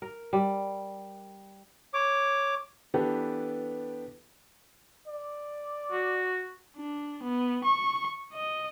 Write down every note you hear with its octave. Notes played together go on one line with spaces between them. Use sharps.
A#4
G3
C#5 D6
E3 B3 D4 G4 A4 B4
D5
F#4
D4
B3
C#6
D#5